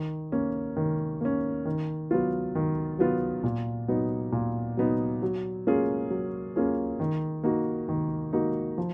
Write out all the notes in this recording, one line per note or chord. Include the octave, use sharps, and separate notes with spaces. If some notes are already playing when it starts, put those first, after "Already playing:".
Already playing: D#3
A#3 C#4
D#3
A#3 C#4
D#3
F#3 B3 F4
D#3
F#3 B3 F4
A#2
F#3 B3 D#4
A#2
F#3 B3 D#4
F#3
A#3 C#4 F4 G#4
F#3
A#3 C#4 F4 G#4
D#3
A#3 D#4 F#4
D#3
A#3 D#4 F#4
F3